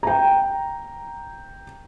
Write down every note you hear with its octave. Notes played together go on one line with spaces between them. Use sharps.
G5 A#5